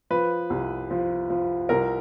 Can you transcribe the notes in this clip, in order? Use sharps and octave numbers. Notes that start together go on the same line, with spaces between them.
F3 B4
C2
F3
F3
C2 A#4